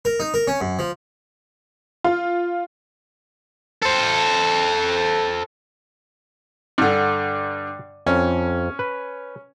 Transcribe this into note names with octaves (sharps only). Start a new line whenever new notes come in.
A#4
D#4
A#4
C#4
F#2
F3
F4
A4 C5
G2 D3 D5 F#5
F2 C#4
B4